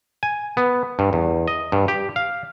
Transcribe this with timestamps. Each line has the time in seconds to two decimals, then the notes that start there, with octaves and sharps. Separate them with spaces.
0.23 G#5
0.57 B3
0.99 G2
1.13 E2
1.48 D#5
1.72 G2
1.88 G4
2.16 F5